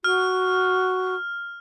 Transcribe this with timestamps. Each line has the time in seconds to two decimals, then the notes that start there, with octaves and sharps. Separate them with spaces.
0.04 F#4 F6